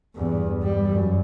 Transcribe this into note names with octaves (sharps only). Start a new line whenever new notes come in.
E2 G2
G3
F#2